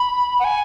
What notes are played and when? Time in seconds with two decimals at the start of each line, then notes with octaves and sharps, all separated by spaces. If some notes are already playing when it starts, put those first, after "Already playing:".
Already playing: B5
0.39 F#5
0.44 G#5